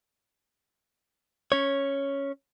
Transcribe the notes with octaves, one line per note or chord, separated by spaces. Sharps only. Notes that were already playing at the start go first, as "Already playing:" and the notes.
C#4 C#5